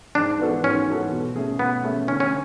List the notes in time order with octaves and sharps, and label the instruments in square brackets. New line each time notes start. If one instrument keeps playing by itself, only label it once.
[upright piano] G#2 [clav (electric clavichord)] D4
[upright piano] E3 B3 F#4 A4
[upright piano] G#2 [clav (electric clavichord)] C#4
[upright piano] E3 B3 F#4 A4
B2
A3 C#4 G#4
[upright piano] B2 [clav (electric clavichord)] B3
[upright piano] A3 C#4 G#4
[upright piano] D3 [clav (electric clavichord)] C#4
[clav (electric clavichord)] C#4